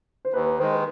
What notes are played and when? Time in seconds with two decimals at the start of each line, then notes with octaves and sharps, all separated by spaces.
0.25 C5
0.33 D#2 B4
0.46 B4
0.59 D#3 G#3 C5
0.72 B4